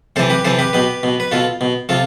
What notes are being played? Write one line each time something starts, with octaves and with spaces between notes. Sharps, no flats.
C3 E3 A4 C5
G4 B4
C3 E3 A4 C5
G4 B4
B2 G4 B4
B2
B4
B2 F4 A4
B2
C3 F4 A4